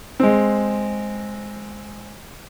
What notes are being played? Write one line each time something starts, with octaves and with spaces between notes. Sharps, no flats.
G#3 C4